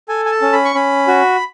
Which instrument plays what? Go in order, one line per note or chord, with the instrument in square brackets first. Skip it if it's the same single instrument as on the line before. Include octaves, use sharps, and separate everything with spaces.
[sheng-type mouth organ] A4 G#5
G#5
A5
C#4
B5
C#6
C#4 B5
F#4